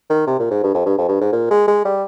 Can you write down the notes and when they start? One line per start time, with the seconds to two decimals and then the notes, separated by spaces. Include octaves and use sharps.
0.10 D#3
0.27 C3
0.39 A#2
0.50 G#2
0.63 G2
0.74 F2
0.86 G2
0.98 F2
1.08 G2
1.21 G#2
1.32 A#2
1.50 G#3
1.67 G#3
1.85 G3